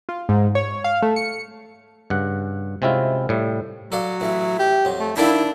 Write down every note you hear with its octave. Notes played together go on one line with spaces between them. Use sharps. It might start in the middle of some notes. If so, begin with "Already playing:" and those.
F4
G#2
C#5
F5
A3
C#7
G2 C#3 F#5
C3 G#3 C4 C#4 E4 F4
A2 G3 A3
F#3 A4 D5 F5
A1 E5
G4
F2 F#3
A3
D#3 D4 E4 A4 F5